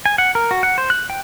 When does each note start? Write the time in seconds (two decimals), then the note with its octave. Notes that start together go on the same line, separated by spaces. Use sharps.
0.06 G#5
0.18 F#5
0.35 A#4
0.51 F#4
0.63 F#5
0.78 C5
0.90 F#6
1.10 G5